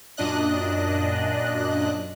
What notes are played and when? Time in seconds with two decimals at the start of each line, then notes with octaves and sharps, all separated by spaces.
0.17 F#2 A#2 D4 D#5 F#6